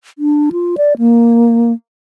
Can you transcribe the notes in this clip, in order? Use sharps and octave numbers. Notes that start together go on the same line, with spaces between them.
D4
F4
D5
A#3